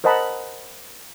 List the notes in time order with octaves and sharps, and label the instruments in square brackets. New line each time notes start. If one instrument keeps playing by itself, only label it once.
[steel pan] A#4 C5 D#5 F#5 A5 B5